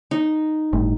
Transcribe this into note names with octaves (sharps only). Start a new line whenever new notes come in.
D#4
G1 A2